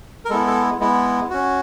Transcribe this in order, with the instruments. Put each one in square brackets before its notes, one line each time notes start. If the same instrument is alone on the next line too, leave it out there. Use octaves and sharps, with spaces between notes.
[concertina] A#4
G#3 B3 E4 A4
A4
G#3 B3 E4
C#4 F#4